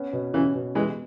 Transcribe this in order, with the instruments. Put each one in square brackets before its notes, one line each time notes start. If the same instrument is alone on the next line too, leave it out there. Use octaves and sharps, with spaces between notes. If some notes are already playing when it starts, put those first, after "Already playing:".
Already playing: [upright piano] B3 C#4
B2
[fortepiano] C#3 E3 [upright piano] C#4
[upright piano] B2
[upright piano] B2 [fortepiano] E3 G#3